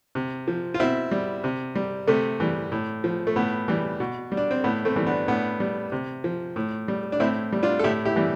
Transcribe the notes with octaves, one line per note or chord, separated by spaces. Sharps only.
C3
F3
F4
B2 C4 E4
G3
C3
G3
C3 A3
E3 G3
A2
F3
A3
A2 B3
E3 G3
B2
G3
D4
C4
A2 B3
A3 C4
E3 G3
B3 D4
A2 B3 D4
G3
C3
F3
A2
G3
D4
A2 C4 E4
G3
D4 F4
A4
A2 E4 G4
E4 G4
E3 G3